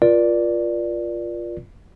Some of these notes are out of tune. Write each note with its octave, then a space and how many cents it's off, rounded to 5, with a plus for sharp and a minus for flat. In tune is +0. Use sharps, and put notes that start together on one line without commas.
F4 +0 A#4 +45 D5 +0